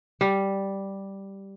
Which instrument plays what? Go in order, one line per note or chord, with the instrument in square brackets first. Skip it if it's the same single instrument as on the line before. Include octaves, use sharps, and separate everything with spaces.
[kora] G3